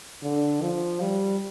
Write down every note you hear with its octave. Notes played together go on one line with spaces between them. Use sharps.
D3
F3
G3